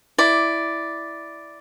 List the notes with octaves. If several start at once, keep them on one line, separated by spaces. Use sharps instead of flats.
E4 D5